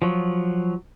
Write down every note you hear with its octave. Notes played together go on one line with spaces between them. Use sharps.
F3 F#3